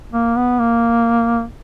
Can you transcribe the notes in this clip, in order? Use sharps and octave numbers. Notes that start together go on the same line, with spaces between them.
A#3
B3
A#3